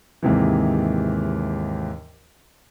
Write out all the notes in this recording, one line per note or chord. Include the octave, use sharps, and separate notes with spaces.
D#2 G#2 C3 E3